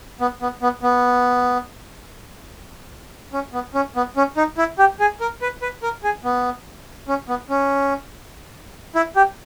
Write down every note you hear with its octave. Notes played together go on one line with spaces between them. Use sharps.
B3
B3
B3
B3
C#4
B3
C#4
B3
C#4
D#4
E4
G4
G#4
A#4
B4
B4
A#4
G#4
B3
C#4
B3
C#4
E4
G4